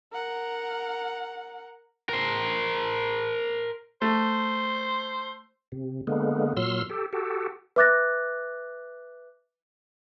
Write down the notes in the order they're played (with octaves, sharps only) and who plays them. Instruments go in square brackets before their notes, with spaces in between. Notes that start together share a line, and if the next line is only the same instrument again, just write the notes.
[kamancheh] A#4 F#5
[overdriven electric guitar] A#4 C5
[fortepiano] A3 [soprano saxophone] C5
[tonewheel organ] C3
D3 G#3 A#3 B3
A#2 F#3 C6 E6 F6
G4 A4
F#4 G4 A4
[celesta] B4 E5 D6 F#6 A6 A#6